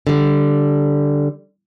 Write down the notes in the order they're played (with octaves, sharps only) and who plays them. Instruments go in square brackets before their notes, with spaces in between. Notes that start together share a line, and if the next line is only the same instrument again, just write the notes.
[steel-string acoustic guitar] D3 G3